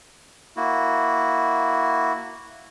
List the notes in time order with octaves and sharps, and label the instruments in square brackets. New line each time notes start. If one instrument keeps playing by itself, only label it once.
[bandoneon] A#3 E4 F#4